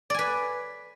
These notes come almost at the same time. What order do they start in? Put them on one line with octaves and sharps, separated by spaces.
D5 G#5 B4